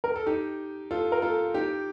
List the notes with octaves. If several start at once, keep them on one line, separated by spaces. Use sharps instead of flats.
A#4
A4
D#4 G4
F4 A4
A#4
F4 A4
D#4 G4